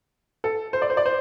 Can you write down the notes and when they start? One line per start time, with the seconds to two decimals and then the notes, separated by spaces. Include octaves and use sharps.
0.44 A4
0.73 C5
0.82 D5
0.90 C5
0.97 D5
1.06 C5